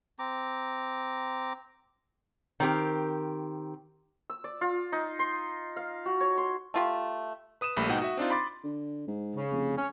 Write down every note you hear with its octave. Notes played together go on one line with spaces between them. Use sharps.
C4 A#5 D6
D#3 C4 G4 A#4
E6
D5
F4
D#4
C6
F5
F#4
C#5
C6
A3 F4 G4
B4 D#6 D#7 E7
A#1 G3 A3 A#3 B5
G#2 B2 D#4 F#5 G5
F#4 E5
C4 D4 D#4 F4
B5 C6 D6 A6
D3
G#2
C#3
F1
C#4